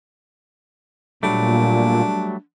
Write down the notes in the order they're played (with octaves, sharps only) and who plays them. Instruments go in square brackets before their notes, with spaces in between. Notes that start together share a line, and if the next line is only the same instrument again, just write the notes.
[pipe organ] A#2 [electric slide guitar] F#3 G3 A3 [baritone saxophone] D4